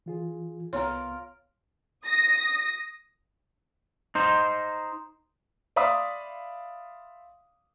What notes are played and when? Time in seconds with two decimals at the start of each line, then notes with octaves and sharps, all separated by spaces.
0.06 E3 F4 G#4
0.73 C2 B3 F4 A#4 C#5
2.06 D#6 A#6
4.15 D#4 C5
5.76 D5 E5 F5 B5 C6 D#6